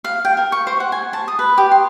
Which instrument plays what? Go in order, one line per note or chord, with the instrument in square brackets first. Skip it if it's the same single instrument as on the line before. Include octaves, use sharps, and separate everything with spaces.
[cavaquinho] F5
G5
A#4
C#6
C5
F#5
G#5
A5
D#6
B4
G4
C6